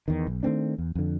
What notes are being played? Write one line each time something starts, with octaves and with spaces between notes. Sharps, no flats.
E2 D#3
B1
D#3 A3 C4 D4
E2
F2 D3